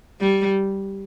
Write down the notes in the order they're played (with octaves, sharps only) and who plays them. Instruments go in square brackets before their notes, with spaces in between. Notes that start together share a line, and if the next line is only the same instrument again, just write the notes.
[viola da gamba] G3